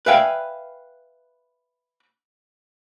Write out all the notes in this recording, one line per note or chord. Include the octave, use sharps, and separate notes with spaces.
B4 D5 E5 F5 G5 G#5